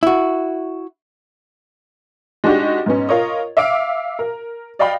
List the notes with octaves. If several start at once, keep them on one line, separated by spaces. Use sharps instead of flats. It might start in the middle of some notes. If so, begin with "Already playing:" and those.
E4 F#4
G#3 D4 D#4 F#4 G4
G#2 B3 C#4
F4 A#4 C#5 D#5
E5 F5 D6 D7
A#4
D5 D#5 F5 G5 B5